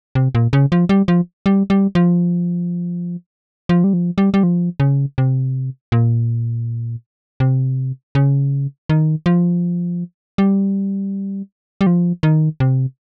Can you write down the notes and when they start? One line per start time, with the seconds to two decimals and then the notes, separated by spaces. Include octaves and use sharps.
0.15 C3
0.35 A#2
0.53 C#3
0.72 F3
0.89 G3
1.08 F3
1.46 G3
1.70 G3
1.95 F3
3.69 F3
3.84 G3
3.93 F3
4.18 G3
4.34 G3
4.43 F3
4.80 C#3
5.18 C3
5.92 A#2
7.40 C3
8.15 C#3
8.89 D#3
9.26 F3
10.38 G3
11.81 G3
11.87 F3
12.23 D#3
12.60 C3